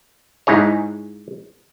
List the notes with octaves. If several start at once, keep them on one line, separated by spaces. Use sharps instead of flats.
G#2 D#4 E4 G#4 C#5